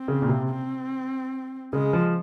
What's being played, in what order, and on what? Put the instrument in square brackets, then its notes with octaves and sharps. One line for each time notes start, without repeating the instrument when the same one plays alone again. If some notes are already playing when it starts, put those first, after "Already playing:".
Already playing: [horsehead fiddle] C4
[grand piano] C#3
A#2
C3
[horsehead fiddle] C4
[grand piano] C#3 [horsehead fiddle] G#3
[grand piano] F3